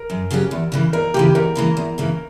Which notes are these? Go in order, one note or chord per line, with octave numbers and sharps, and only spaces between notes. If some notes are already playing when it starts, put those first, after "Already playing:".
Already playing: A#4
F#2
C#3 F#3 C#4 G4
E2
C#3 E3 A#3
E2 A#4
C#3 E3 A#3 G4
E2 A#4
C#3 E3 A#3
E2
C#3 E3 A#3